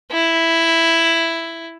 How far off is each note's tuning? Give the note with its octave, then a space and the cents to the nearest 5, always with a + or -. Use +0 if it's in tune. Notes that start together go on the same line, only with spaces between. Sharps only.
E4 +5